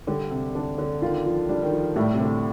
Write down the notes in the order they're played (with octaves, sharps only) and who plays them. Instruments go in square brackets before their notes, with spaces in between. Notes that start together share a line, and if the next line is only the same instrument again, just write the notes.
[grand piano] D3 [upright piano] G3
[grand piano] C3
[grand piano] D3 [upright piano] D4
[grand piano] D3
[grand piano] D#3 [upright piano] F4
[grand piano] F3
[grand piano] G3 [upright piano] D4
[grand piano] D#3
F3
[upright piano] A2 [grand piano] G3
[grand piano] C3
D3